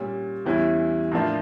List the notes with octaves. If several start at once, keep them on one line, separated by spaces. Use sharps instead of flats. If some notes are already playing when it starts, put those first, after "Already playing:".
Already playing: A#2 G3 C#4
E2 E3 G3 C#4 E4
A2 F3 A#3 D4 F4